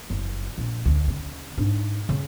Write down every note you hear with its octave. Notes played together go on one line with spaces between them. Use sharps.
F#1
A#1
D2
C#3
G#2 D4
C#3